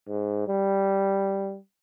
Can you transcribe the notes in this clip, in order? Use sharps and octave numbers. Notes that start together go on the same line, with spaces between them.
G#2
G3